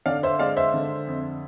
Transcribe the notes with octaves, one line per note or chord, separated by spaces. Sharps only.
D3 D5 F5
C5 E5
G#3 D5 F5
C5 E5
D3
F2